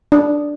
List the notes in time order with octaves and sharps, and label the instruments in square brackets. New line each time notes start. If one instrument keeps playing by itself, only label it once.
[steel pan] D4